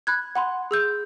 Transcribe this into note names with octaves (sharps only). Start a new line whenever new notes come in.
B5 F#6 G#6
F#5 B5 C6
G#4 E6 G6